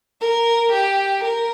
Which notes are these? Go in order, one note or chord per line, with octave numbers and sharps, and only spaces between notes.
A#4
G4
A#4